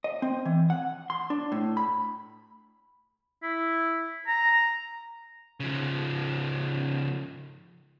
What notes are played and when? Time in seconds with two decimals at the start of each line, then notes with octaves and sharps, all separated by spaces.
0.04 D#5
0.22 C4
0.45 E3
0.70 F#5
1.10 C6
1.30 D4
1.52 A2
1.77 B5
3.43 E4
4.28 A#5
5.60 C#3 F3